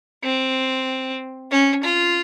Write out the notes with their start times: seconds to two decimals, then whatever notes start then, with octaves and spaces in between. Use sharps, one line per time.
0.23 C4
1.51 C#4
1.83 F4